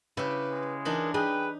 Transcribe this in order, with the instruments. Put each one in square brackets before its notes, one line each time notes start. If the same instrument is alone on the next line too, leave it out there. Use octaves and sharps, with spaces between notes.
[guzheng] C#3 G4 [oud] E4 [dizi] B4
[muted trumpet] G#3
[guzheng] E3 D4 D#4 [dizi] A#4
[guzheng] D#4 [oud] G#4 [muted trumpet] B4 [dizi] G5